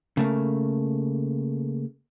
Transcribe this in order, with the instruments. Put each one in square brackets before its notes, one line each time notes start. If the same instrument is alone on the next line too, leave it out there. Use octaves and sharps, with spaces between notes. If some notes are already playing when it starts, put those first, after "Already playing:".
[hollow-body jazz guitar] C#3 A3 A#3